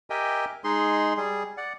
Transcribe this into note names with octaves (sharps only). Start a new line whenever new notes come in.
G4 A#4 D#5 E5 G5 G#5
G#3 D#4 G#4 C6
G3 G#4
D5 F#5